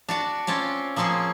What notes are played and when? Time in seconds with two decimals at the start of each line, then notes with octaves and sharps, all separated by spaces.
0.09 D4 F#4 D5
0.47 C4 C#4 F4 D5
0.96 F3 A#3 C4 C#4 G#4